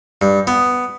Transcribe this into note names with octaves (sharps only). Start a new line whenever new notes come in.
G2
B3